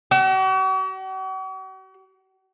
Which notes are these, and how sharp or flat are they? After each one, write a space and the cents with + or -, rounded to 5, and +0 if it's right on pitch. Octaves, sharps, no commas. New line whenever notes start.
F#4 +45